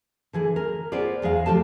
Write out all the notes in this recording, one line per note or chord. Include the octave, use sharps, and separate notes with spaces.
D3 E3 G#4
A#4
B3 F4 G#4 C5 D5
E2 G#3 G#4 F5
D2 F3 A3 G4 A4 A5